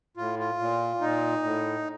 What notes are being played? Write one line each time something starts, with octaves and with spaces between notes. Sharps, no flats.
A2 F4
F4
A#2
A#2 D#4
A2